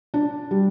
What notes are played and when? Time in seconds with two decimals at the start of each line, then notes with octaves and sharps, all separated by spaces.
0.14 D4
0.51 G3